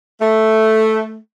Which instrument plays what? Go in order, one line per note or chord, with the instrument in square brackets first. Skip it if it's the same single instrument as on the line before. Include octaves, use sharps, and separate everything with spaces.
[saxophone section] A3